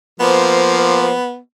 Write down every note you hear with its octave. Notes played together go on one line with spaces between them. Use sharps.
F3 A#3 B3 C5